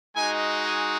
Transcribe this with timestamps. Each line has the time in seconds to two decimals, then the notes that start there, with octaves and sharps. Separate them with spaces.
0.15 G#3 D#4 F#4 G#5
0.66 G#5